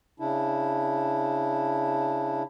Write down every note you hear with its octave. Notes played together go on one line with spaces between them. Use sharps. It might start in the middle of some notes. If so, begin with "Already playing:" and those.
C#3 D4 E4